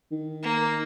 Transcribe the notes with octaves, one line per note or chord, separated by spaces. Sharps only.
D#3
A#3